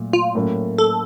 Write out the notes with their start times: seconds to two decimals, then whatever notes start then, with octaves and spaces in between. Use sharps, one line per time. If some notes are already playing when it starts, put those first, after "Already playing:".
Already playing: A#2 F#3 A3
0.13 F4
0.35 A2 F#3 A#3 C#4
0.78 A4